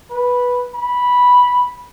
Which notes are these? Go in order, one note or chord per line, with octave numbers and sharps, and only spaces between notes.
B4
B5